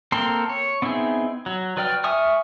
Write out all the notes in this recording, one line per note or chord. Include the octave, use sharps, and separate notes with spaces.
A#3 C4 A4 A#4 C6
C#5
B3 C4 D#4 E4 G#4
F#3
F#3 B4 D5 G5 F6
E5 G#5 C#6 D#6 F6